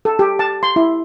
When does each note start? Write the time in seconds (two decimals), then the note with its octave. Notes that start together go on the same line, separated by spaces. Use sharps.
0.05 A4
0.19 G4
0.39 A5
0.63 C6
0.76 E4